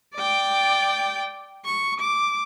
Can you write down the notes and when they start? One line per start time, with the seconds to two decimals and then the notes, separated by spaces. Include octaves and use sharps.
0.15 D5 G5
1.65 C#6
2.00 D6